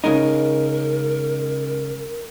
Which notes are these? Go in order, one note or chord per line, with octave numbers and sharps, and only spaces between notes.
C#3 G#3 D#4 A#4